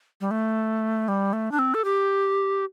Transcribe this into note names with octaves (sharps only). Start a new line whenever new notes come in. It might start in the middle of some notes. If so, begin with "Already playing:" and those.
G3
A3
G3
A3
D4
C4
A4
G4